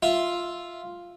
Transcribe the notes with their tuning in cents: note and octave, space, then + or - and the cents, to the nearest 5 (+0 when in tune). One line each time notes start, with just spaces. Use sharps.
F4 +0 E5 +0